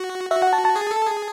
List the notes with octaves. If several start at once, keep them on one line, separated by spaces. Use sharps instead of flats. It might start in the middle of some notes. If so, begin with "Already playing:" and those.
Already playing: F#4
F#4 E5
F#5
A5
A5
G#4
A4
G#4